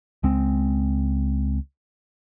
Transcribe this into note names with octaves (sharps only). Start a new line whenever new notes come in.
C#2 G#3 C4